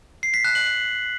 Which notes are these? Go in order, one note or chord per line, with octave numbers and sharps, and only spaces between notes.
C7
B6
F#6
F#7